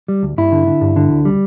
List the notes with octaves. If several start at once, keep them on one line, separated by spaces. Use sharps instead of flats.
G3
D2
G2 E4
D3
D3
G2
D3
D2
G3